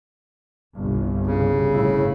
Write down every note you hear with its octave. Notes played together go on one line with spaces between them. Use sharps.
G1 C2
C#3
A2 E4